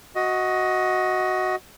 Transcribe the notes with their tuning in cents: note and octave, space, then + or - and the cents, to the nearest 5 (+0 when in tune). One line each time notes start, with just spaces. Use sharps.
F#4 +0 D#5 +15